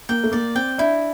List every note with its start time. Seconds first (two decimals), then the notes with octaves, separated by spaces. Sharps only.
0.09 A#3 G5
0.24 A3
0.32 A#3 D5
0.55 C4 G5
0.78 D4 E4